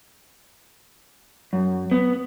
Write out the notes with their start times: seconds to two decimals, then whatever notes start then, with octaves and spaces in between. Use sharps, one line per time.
1.53 F#2
1.91 B3